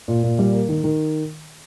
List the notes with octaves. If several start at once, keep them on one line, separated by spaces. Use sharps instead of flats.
A#2
A#2
G3
A#3
D#3
D#3